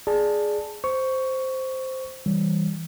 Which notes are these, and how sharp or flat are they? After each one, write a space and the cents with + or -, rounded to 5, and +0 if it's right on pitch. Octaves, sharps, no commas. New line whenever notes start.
G#4 +5 D5 +5 A5 +10
C5 +0 C#6 +10
E3 -10 G3 +0